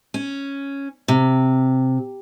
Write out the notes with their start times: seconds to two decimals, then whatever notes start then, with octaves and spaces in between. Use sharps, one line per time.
0.14 C#4
1.08 C3